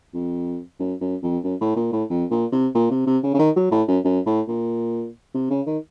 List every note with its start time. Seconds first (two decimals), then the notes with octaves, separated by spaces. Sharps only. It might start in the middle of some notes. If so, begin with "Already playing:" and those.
0.14 F2
0.79 F#2
1.01 F#2
1.23 F2
1.44 F#2
1.61 A2
1.76 A#2
1.93 A2
2.09 F2
2.30 A#2
2.52 C3
2.75 A#2
2.91 C3
3.07 C3
3.23 C#3
3.34 C#3
3.39 D#3
3.56 F#3
3.71 A2
3.88 F#2
4.04 F#2
4.26 A2
4.48 A#2
5.34 C3
5.50 C#3
5.66 D#3